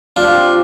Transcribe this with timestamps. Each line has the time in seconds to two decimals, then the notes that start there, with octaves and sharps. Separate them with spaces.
0.16 F3 C4 D4 F4 G4